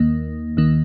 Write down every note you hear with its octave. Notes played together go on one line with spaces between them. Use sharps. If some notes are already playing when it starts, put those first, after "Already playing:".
Already playing: D#2 D#3 A#3
D#2 D#3 A#3